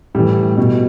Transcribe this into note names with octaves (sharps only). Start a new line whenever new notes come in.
A2 E3 G3
B2